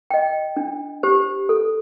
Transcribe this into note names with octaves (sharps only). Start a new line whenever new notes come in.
D#5 G5
D4
G4 C5
A4